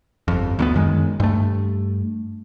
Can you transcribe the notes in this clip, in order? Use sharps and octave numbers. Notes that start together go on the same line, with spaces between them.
G1 F2
D2 A#3 B3
F#2 D#3 G#3
G2 A3